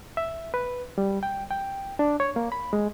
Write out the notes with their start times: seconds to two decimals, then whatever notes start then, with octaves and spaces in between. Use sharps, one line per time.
0.17 E5
0.54 B4
0.98 G3
1.23 G5
1.51 G5
1.99 D4
2.20 C#5
2.36 A#3
2.52 B5
2.73 G#3